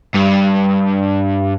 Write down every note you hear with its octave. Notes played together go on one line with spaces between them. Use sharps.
G2